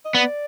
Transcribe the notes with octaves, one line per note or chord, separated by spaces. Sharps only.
D#5
B3 D5